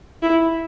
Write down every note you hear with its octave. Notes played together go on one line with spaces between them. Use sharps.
E4